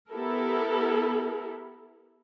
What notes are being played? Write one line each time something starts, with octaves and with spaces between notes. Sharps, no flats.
B3 E4 G4 A4 A#4